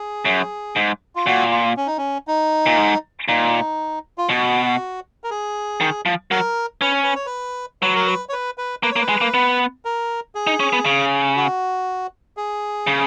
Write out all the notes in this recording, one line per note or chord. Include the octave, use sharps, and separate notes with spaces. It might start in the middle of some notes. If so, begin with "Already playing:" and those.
Already playing: G#4
F#2
G#2
F4
A#2 F#4
F4
C#4
D#4
C#4
D#4
A#2
G#2
A#2 D#4
F4
B2 F#4
A#4
G#4
D#3
F3
F#3 A#4
C#4 B4
C#5
B4
C#5
B4
F#3 B4
A#4
B4
C#5
B4
B4
A#3 B4
C#5
A#3
B4
G#3
A#3
B3
A#4
G#4
D#4
C#4
B3
C#3
F#4
G#4
C#3